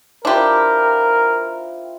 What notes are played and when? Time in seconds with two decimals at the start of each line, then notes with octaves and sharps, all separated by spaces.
0.25 D4 E4 F4 G4 A#4 C5